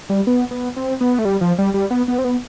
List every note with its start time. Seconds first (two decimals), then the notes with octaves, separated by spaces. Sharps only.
0.10 G3
0.27 B3
0.51 B3
0.76 C4
1.01 B3
1.19 A3
1.25 G3
1.41 F3
1.58 G3
1.74 G3
1.91 B3
2.08 B3
2.18 C4
2.24 B3